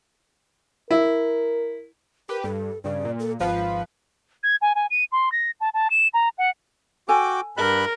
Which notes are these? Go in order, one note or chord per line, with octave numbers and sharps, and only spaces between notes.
E4 A#4
G4 A#4 B4
G2 A4
G2 C#3 D5
A#2
A4
G#1 F3 B4 F5
G#6
G#5
G#5
D#7
C6
A#6
A5
A5
E7
A#5
F#5
F#4 A4 G5 G#5 D6
G2 A#4 B5 F#6